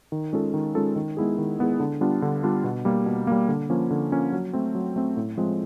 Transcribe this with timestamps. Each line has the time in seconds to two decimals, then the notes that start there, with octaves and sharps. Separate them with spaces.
0.12 D#3
0.33 G#3 C#4 F4 A4
0.54 D#3
0.75 G#3 C#4 F4 A4
0.96 D#3
1.17 G#3 B3 E4 G#4
1.38 D#3
1.59 G#3 B3 E4 G#4
1.80 D3
2.01 G3 B3 D4 F4
2.22 D3
2.43 G3 B3 D4 F4
2.64 B2
2.85 G3 A#3
3.06 B2
3.27 G3 A#3
3.48 D3
3.70 F3 A#3 C#4
3.91 D3
4.12 F3 A#3 C#4
4.32 F#3
4.53 A3 C4
4.75 F#3
4.96 A3 C4
5.17 A2
5.38 F3 G#3 C4